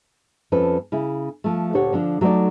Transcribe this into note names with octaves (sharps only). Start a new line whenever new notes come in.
F2 F3 C#4 A4 B4
C#3 E4
F3 A3
D2 A#2 G4 A4 C#5 F#5
D3 F3 D4
F#3 A3 D#4 A4 D5